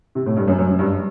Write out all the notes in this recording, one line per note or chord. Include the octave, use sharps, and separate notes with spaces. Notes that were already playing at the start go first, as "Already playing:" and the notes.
C3
A2
G2
F#2
F#2
G2